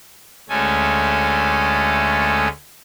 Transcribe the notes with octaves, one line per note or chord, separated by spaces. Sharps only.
D2 G#3 A3 C#4 A4 G#5